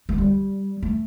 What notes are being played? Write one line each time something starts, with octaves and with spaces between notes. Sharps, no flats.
A3
G3
A3